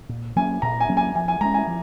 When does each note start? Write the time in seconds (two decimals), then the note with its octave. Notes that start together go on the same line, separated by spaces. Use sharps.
0.09 A#2
0.36 F#3 A#3 C#4 G#5
0.62 A#2 A#5
0.80 G#5
0.89 F#3 A#3 C#4
0.97 G#5
1.15 F3 G#5
1.28 G#5
1.41 G#3 C#4 A#5
1.54 G#5
1.67 F3